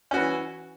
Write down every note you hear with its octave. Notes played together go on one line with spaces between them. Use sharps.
E3 C#4 F#4